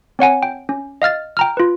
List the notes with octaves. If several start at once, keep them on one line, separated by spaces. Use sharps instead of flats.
C4 C#5 F#5 G#5
G5
C#4
D#5 F5 F6 A6
G5 A#5 F6
F4 B4